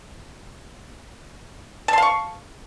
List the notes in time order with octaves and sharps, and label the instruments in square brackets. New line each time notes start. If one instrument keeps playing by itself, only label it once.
[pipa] A5
C6
F5
C#6